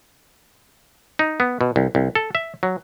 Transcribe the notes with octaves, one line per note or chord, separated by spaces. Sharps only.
D#4
B3
B2
C2
C2
A4
E5
F#3